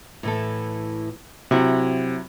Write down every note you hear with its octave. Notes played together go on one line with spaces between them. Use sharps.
A2 E3 A4
C3 F#3 E4 F#4